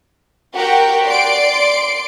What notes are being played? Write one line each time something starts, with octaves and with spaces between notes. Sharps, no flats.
F#4 G4 A#4 F#5 G5
D5 C6 D7